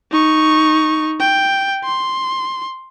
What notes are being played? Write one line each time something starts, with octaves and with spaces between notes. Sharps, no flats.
D#4 C#6
G5
C6